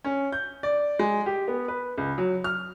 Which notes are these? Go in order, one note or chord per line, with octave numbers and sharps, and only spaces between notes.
C#4
G6
D5
G#3
G4
B3
B4
C#2
F#3
F6